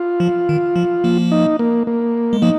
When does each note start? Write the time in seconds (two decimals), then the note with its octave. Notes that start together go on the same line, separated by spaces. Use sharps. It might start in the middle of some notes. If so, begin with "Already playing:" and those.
Already playing: F4
0.20 F3
0.49 D#3
0.76 F3
1.04 F3 A#3
1.32 D#4
1.59 A#3
1.87 A#3
2.33 G#3
2.42 F3 A#3 D#4